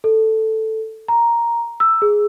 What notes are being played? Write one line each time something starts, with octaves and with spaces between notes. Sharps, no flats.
A4
A#5
E6
G#4